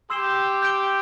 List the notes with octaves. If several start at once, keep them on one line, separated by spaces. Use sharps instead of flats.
G4 C6 E6 C7 E7 G7
G6 D7 G7